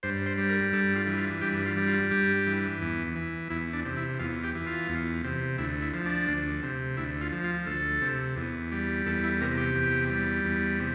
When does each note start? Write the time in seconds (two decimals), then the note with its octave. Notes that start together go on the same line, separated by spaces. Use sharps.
0.03 G2 C5
0.26 C5
0.38 G3
0.49 A#4
0.73 G2 A4
0.96 F4
1.07 E3
1.18 F4
1.41 G2 G4
1.66 F4
1.76 G3
1.88 F4
2.11 G2 G4
2.47 E3
2.81 E2
3.15 E3
3.50 E2 E4
3.73 D4
3.85 C3
3.97 E4
4.19 E2 F4
4.44 G4
4.55 E3
4.67 F4
4.89 E2
5.24 C3
5.58 D2 E4
5.82 E4
5.93 F3
6.06 D4
6.28 D2
6.63 C3
6.97 D2 E4
7.21 F4
7.32 F3
7.44 F4
7.66 D2 A4
8.02 C3
8.36 E2
8.72 G3
9.06 E2 A4
9.24 E4
9.41 C3 A#4
9.58 G4
9.76 E2
10.10 G3
10.45 E2
10.80 C3